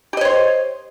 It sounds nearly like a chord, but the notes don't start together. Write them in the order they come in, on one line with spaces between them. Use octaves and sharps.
G4 D#5 C#5 C5